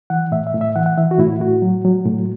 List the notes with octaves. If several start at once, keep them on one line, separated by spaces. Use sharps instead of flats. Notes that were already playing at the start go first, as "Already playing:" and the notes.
E3 F#5
A2 E5
E5
A2
E5
E3 F#5
F#5
E3 E5
F#4
A2 E4
A2 F#4
F#3
F#3
A2